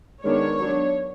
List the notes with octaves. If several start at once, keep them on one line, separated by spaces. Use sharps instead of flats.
D#3 G#3 B3 D4 C#5
F#3 B3 D4